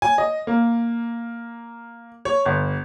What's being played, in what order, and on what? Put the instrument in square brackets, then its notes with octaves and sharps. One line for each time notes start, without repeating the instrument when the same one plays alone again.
[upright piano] G#5
D#5
A#3
C#5
G1